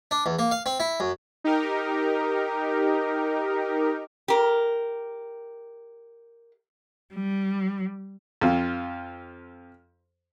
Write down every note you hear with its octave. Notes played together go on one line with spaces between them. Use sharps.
D4
E2
A#3
F5
C4
E4
F#2
D#4 G4 A#4
G4 A#4
G3
F2 F4